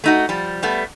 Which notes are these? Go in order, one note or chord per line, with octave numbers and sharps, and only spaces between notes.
A3 D#4 F#4
F3 G3
G3 A3 B3